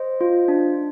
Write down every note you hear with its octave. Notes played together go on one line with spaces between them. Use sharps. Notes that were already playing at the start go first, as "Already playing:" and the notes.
Already playing: C5 D#5
F4
D4